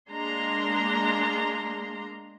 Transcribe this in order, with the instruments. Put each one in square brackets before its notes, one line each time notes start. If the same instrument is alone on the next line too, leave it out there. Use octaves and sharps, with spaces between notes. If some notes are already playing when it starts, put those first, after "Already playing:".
[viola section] G#3 A#3 D4 A#5 C6